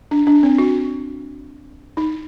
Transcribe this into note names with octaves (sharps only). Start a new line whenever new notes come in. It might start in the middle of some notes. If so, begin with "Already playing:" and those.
D4
D4
C4
F#4
D#4